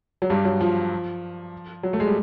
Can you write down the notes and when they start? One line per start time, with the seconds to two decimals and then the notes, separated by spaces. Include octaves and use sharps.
0.22 F#3
0.30 G2 G3
0.45 F#3
0.61 F3
1.83 F#3
1.93 A3
2.00 G#3
2.07 G3